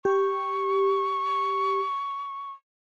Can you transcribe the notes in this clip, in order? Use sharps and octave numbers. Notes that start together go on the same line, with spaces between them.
G4 C#6